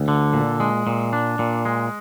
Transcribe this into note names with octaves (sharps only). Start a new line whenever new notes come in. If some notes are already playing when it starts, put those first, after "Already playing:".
Already playing: D2
D3
A#2
G#3
A#2
D4
A#2
G#3